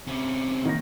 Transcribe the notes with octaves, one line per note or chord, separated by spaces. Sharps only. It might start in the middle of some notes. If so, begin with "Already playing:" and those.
C3 C#4
D#3 A#3 A#6